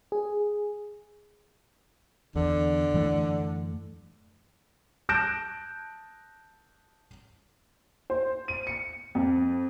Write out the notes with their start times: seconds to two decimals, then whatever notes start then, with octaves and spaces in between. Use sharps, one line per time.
0.12 G#4
2.35 E2 D3
2.94 F#2 E3 A3
5.09 A5 F#6 G6 A#6 D7 E7
8.10 C5
8.48 D#7
8.67 C#7
9.15 F2